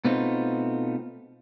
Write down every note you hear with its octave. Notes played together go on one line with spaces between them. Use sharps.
B2 A3 B3 C4 D#4 F4